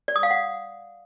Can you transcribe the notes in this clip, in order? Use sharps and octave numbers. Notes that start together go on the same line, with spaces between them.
D5
D#6
F5
F#5